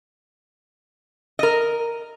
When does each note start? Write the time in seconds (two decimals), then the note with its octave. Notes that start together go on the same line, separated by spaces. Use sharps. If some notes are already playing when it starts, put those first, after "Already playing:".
1.39 A#4 D#5